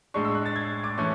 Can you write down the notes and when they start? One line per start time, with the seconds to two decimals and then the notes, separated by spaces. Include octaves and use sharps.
0.14 A2 G#3 D4 C#6
0.25 E6
0.35 F#6
0.46 A6
0.56 G#6
0.84 D6
0.97 E3 A3 C#4 C#6